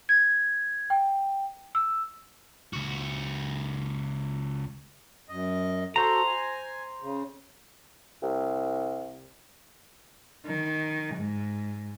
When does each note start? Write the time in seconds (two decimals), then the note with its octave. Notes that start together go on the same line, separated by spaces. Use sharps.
0.09 G#6
0.90 G5
1.75 E6
2.73 C#2 F#4
5.29 F#2 D#5
5.96 F#4 A4 C5 A#5
6.27 G#5
7.02 C#3
8.22 C2
10.46 D#3
11.16 G#2